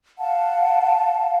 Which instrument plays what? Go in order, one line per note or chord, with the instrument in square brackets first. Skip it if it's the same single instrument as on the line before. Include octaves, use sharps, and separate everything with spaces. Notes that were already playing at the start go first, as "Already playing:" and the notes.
[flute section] F5 F#5 A5